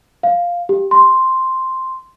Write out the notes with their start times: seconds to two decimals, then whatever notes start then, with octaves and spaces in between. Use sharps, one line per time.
0.23 F5
0.69 G4
0.91 C6